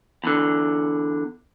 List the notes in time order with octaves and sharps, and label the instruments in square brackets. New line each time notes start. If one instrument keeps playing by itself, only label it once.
[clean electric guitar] E2 D3